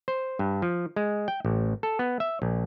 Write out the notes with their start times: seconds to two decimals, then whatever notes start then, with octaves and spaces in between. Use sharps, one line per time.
0.08 C5
0.39 G2
0.62 F3
0.96 G#3
1.28 G5
1.45 A1
1.83 A4
1.99 B3
2.20 E5
2.42 A#1